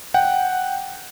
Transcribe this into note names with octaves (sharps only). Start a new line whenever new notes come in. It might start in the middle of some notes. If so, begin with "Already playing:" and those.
F#5 G5